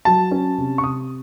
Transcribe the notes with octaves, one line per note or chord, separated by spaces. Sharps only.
F#3 A5
C#4
C3
C#6
C3 D#6